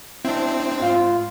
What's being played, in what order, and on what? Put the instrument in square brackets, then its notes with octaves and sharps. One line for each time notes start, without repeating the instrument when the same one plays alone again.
[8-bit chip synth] C4 [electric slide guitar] D4 E4
[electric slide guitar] G#2 F5 [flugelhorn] F4